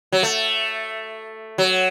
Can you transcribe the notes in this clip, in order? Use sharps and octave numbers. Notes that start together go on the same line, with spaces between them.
F#3
A3
F#3